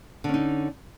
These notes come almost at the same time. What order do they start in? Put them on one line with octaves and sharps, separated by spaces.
D3 C#4 D#4